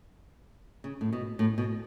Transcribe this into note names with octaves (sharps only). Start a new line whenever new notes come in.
C#3
A2
B2
A2
B2